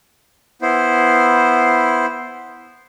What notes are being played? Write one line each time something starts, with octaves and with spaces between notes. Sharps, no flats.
B3 E4 C5